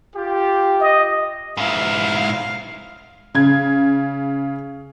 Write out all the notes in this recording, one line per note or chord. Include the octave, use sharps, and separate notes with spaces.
F4 G4
D#5
G#2 E4 F5
C#3 G#6